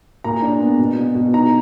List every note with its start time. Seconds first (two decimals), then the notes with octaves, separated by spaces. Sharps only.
0.24 A#2 A#5
0.42 D4
0.61 B3
0.79 B2
0.97 B2
1.15 B2
1.33 D#4 A#5